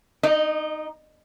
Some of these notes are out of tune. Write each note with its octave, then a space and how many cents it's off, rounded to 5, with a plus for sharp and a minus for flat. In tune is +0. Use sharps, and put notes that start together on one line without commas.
D#4 +0 D#5 -35